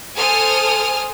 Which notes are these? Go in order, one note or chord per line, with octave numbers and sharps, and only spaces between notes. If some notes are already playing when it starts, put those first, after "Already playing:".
A4 C5 G#5 D#6 F6